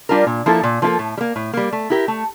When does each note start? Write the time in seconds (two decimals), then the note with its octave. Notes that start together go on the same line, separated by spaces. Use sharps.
0.09 G3 D4 F4 A#4
0.27 A#2
0.46 F3 A#3 E4 A4
0.63 A#2
0.82 F3 A#3 E4
0.87 A4
0.99 A2
1.17 G3
1.21 A#3
1.36 A2
1.53 G3 A#3
1.73 A3
1.90 E4 G4 A#4
2.08 A3